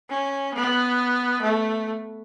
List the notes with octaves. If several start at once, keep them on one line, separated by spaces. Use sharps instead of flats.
C#4
B3
A3